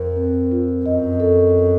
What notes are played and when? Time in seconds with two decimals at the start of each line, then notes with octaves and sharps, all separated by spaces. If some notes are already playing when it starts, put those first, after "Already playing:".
Already playing: F2 A#4
0.16 C4
0.51 F4
0.85 F#2 D#5
1.20 A4